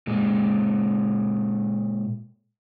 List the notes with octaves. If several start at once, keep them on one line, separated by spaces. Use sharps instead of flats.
A#2 G#3